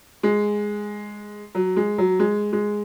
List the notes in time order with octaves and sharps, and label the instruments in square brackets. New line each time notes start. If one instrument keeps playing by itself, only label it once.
[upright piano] G#3
F#3
G#3
F#3
G#3
G#3